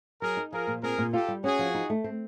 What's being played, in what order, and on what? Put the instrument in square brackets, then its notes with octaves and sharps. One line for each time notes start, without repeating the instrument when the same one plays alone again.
[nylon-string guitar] F#3 [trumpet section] G#4 A#4
[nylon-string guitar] D#4
[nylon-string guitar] F3 [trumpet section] G#4 A#4
[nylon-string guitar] A#2
[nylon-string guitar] C4 [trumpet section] G#4 A#4
[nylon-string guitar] A#2
[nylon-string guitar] F4 [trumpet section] G4 A4
[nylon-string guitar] G3
[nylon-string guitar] C#4 [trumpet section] F#4 G#4
[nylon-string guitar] F3
D#4
A3
C4